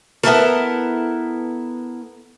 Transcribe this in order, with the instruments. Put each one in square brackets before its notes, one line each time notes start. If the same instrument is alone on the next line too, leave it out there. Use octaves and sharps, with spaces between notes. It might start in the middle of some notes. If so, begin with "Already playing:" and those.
[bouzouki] B3 E4 A4 A#4